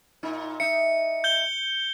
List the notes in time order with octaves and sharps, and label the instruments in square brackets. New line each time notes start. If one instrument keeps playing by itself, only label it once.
[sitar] A#2 D#4
[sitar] D#4 E5 [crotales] C#7
[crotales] G6 G7